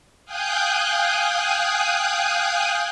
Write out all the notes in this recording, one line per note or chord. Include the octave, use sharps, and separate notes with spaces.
F5 G5 G#5 D#6 F#6 G6